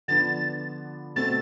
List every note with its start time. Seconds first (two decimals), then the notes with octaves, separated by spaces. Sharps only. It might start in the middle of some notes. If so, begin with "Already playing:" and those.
0.08 D3 F3 B3 D4 A6
1.16 B2 A3 C4 A6